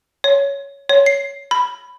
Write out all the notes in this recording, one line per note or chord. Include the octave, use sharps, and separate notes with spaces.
C#5
C#5
C7
B5